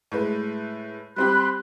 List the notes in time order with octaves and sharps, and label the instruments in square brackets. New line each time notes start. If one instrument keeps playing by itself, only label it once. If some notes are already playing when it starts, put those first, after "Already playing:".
[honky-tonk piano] A2 G#3 B4
[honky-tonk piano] G3 C4 G4 [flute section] B5 C6 F#6